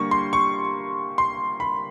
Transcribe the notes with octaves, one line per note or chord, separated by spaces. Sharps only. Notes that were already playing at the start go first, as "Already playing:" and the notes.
Already playing: D3 G3 A#3 C#6
C6
C#6
C6
B5